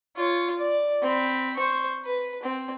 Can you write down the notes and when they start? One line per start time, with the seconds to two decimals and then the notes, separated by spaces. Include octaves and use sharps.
0.17 F4 C#5
0.59 D5
1.03 C4 B5
1.57 C5 C#6
2.06 B4
2.43 C4